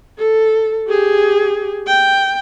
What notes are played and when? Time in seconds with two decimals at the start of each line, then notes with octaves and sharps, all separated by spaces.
0.18 A4
0.88 G4 G#4
1.87 G5